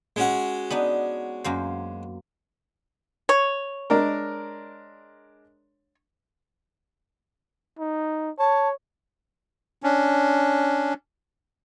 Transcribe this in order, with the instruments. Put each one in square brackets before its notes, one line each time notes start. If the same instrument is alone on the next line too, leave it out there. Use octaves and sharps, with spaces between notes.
[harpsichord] G#3 C#4 F#4
[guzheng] B3 D4 D#4
F#2 A#3 C5
[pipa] C#5
[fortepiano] G#3 D4 A#4
[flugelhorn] D#4
[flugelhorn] C#5 [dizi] A5
[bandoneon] C#4 D4